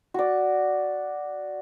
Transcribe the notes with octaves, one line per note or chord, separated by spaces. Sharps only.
F#4 D5